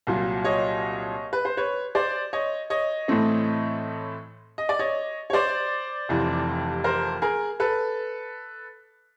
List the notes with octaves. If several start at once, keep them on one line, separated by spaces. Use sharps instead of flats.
C2 A#2 F#3
C#5 D#5
B4
C5
B4 C#5
C5 D5
C#5 D#5
C#5 D#5
A2 E3 A3 C4
D#5
D5
C#5 D#5
C#5
C5 D5
F1 F2 C3 E3
A#4 C5
G#4 A#4
A4 B4